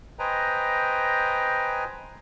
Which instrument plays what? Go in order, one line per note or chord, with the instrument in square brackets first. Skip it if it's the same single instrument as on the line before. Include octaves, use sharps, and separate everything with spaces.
[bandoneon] B4 C5 D#5 G5 G#5 A#5